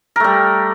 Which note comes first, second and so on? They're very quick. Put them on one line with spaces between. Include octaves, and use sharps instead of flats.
A#4 A3 G3